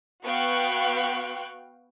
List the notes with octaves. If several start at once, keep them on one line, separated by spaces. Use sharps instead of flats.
B3 F#4 F5 G5 C#6 F#6